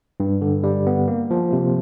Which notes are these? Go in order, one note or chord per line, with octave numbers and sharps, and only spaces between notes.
G2
D3
G3
B3
A#3
F3
C3